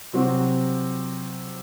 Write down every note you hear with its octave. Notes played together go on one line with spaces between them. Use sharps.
C3 F#3 C4 F#4